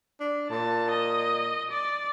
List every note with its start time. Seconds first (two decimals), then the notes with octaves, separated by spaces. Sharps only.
0.20 D4
0.50 A#2 A5
0.91 D#5
1.71 D5